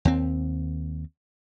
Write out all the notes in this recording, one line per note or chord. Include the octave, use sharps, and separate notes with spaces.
D#2 C4